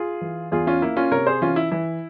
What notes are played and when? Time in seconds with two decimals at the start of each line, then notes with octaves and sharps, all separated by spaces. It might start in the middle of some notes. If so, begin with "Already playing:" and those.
Already playing: F4 G#4
0.21 E3
0.52 E2 F4 G#4
0.67 C#4 F4
0.82 A#3 E4
0.97 C#4 F4
1.11 C3 A#4 C#5
1.27 G#4 C5
1.42 E3 C#4 F4
1.56 E4
1.72 E3 E4